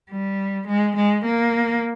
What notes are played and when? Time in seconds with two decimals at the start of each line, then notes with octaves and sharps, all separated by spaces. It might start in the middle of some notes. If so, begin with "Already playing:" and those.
0.11 G3
0.68 G#3
0.96 G#3
1.25 A#3